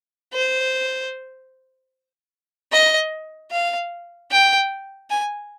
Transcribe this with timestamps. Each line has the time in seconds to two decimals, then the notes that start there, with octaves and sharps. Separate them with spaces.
0.33 C5
2.72 D#5
3.51 F5
4.31 G5
5.10 G#5